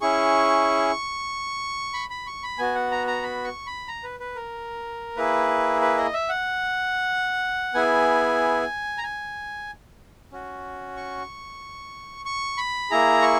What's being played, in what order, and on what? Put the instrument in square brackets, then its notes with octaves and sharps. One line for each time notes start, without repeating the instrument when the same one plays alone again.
[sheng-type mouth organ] C#4 E4 G#4 C#6
B5
B5
C#6
B5
B3 F#4 G#5
F#5
A#5
A#5
B5
C#6
B5
A#5
B4
B4
A#4
A#3 E4 G#4 B4
B4
D#5
E5
F#5
B3 E4 G#4 G#5
A#5
G#5
C#4 F#4
C#6
C#6
B5
A#3 E4 G#4 A#5
C#6